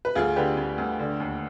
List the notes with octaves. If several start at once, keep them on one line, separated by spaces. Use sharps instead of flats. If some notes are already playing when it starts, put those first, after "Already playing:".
B4
D2 F4 G#4
D3 G4 B4
D2
D2
D3
D#2